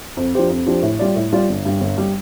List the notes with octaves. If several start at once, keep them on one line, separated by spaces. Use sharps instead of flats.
F2
F3 D4 G4 C5
F2
F3 D4 G4 C5
A2
G3 F4 D5
A2
G3 F4 D5
G1
G2 G3
G1
G3